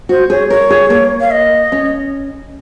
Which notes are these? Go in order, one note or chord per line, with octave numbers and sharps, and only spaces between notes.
F#4 C5
G#4 C#5
A#4 C#5
G#4
A#3
F5
D#5
C#4